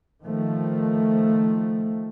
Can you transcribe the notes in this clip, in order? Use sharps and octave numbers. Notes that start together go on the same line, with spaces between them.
D#3 F3 A3